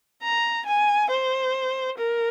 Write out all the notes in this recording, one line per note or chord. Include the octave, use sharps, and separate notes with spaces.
A#5
G#5
C5
A#4